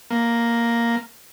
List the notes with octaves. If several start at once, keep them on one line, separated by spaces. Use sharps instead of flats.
A#3